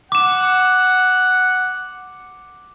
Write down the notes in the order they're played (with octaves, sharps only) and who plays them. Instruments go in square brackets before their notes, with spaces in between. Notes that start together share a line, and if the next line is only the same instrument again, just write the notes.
[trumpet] F#5 [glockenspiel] D6 E7